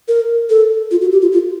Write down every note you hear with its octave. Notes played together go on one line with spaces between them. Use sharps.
A#4
A4
F4
F#4
G4
F4
F4